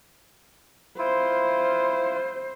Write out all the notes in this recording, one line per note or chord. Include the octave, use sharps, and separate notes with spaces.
E4 F4 C5